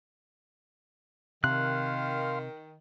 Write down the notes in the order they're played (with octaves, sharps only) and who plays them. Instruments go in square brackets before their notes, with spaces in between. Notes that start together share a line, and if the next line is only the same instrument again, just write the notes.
[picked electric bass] C3 [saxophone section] D#3 [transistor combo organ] F5 C6 [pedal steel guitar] F#6